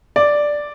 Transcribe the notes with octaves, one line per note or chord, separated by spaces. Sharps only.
D5